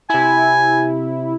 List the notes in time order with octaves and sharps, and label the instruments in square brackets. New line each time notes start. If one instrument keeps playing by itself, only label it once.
[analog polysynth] C3 E4 [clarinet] G#5